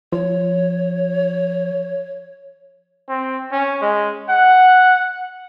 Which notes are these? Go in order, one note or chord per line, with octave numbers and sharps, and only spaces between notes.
F3 C#5
C4
C#4
G#3
F#5